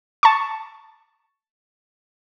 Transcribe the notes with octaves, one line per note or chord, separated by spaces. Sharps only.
A5 C#6